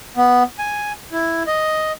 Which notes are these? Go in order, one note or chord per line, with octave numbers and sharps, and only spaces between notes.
B3
G#5
E4
D#5